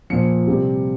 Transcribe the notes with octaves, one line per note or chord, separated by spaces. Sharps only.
A#2 F3 C#7
C3 G3